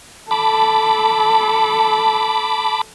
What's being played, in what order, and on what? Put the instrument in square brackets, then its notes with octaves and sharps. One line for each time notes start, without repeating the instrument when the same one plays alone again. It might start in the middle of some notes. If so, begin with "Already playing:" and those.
[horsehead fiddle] A4 [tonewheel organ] A5 B5 D6